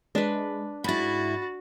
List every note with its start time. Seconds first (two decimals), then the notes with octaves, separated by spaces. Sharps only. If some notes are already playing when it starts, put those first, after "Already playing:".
0.15 G#3 D4 B4
0.84 G#2 E4 F#4 B5 A6